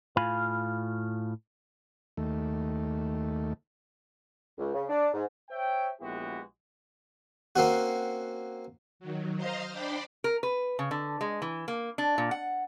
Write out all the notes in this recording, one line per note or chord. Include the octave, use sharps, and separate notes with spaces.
A2 F4 F5 G#5 B5
D#2 A3
C#2
C#3
D4
G#2
C5 C#5 E5 G5
A#1 G#3 B3 E4 F#4 G4
A#3 C4 C#4 F#4
D#3 F#3
C5 D#5 F5 A#5 C6 F6
D4 C5 D5 G5 B5 C6
A#4
B4
C#3
D3
G#3
E3
A#3
D4
A#2
F#5